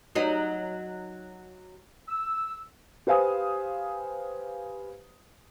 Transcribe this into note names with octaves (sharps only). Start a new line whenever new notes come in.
F#3 D#4
E6
G4 B4 C5 F5 G#5 D#6